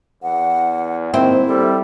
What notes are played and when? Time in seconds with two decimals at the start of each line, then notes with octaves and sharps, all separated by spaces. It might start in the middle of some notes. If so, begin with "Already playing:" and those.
0.23 E2 F#5
1.14 D#3 A#3 C4 E4
1.47 G3 A4